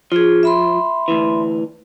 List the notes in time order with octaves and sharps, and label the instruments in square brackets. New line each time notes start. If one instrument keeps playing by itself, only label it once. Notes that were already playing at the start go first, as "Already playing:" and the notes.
[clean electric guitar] F3 [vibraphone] F4 G#4
[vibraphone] E5 B5 C6
[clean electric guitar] D2 E3